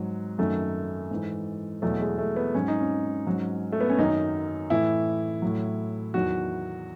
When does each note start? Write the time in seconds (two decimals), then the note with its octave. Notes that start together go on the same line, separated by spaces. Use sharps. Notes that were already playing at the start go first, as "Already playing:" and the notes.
Already playing: G#2 F#3
0.38 F#2 D#3 F#3 A3
1.11 G#2 E3
1.82 E2 B2 F#3 A3
2.01 G#3
2.18 A3
2.36 B3
2.54 G#2 F#3 C#4
2.68 D#4
2.80 C#4
3.27 G#2 F#3
3.72 A3
3.81 B3
3.90 C#4
3.98 F#2 D#3 F#3 D#4
4.70 A2 E3 E4
5.42 A2 F#3
6.14 E2 D#3 F#3 F#4